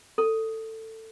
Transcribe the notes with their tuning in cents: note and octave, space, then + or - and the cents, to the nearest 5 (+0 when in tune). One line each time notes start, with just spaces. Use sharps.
A4 +15